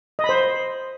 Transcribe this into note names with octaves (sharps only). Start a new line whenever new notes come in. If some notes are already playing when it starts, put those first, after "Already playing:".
D#5
B5
C5